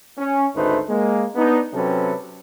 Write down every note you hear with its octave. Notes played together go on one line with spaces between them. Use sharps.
C#4
G#1 D2 A3 D#4 B4 C5
G#3 A#3
B3 D4 D#4
C3 F#3 C4 C#4 A4 B4